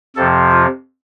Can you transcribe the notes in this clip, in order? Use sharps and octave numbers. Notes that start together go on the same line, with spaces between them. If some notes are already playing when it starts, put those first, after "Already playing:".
F2 C3 F3 A4
F4